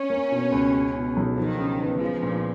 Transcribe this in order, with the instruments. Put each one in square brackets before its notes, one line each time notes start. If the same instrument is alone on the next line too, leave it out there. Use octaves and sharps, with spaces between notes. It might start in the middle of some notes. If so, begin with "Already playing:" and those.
Already playing: [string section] C#4
[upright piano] A#3
B2
C#2
G#3
B2
B1
[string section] D#3 [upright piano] F3
[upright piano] C#3
B3
[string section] F3 [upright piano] G#3
[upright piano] A#2